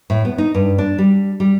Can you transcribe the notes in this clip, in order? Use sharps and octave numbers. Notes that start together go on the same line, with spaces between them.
A2
B3
D#4
G2
D4
G3
G3